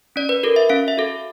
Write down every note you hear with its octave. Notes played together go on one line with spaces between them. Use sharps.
C#4 D5
B4
F#4 A4 A#4
E5
C#4 F5
E5
F#4 A4